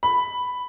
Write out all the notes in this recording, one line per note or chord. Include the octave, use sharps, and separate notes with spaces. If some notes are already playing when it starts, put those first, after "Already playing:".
B5